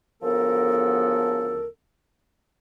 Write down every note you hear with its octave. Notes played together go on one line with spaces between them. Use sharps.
D2 C#3 F3 B3 A4 A#4